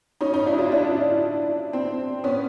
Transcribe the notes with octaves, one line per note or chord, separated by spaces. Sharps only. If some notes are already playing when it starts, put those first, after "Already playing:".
C#4 D#4
C#4 D#4
D4 E4
D#4 F4
D4 E4
C4
B3 C#4